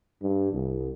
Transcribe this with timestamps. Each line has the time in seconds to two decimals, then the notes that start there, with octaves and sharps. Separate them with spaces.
0.22 G2
0.53 C2